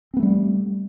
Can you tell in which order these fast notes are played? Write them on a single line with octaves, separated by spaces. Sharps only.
C4 B3 A3 G3